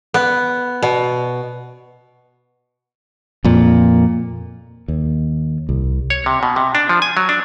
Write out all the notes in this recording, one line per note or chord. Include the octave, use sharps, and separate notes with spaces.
B3
B2
F2 A#2
D#2
C2
C#5
C3
B2
C3
D4
F3
G#5
F#3
D4